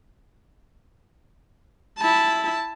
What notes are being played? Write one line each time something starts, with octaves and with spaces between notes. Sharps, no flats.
E4 A5